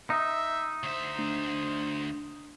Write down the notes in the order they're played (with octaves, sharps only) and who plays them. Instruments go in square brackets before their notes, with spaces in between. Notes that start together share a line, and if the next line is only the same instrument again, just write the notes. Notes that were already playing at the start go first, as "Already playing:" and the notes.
[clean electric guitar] D#4 [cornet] E5
[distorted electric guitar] D2 E5 [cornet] C5
[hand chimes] A3 D4